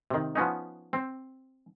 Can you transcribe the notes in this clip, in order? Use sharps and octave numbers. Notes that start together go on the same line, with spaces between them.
C3 D#3
F3 B3 C#4 D#4
C4